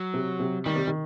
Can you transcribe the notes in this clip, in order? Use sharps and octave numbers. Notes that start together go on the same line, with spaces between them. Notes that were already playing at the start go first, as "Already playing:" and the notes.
Already playing: F#3
C3
C3
D#3 G3
C3
D#3